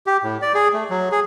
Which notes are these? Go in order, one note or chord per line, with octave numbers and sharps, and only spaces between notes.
G4
A2
D5
G#4
A3
F#3
G#4